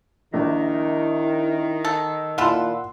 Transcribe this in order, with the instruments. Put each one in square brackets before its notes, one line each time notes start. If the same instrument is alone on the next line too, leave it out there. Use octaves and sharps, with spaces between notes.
[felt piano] A#1 [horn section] D#3 [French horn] E4
[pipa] A4
[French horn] A#2 [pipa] E4 F4 A4 [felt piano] F#5 C6